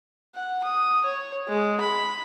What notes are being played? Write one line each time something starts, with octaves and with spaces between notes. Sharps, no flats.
F#5
D#6
C#5
G#3
B5